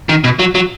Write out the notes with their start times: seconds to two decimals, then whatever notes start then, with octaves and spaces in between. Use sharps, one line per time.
0.09 D#3
0.24 B2
0.39 F#3
0.55 F#3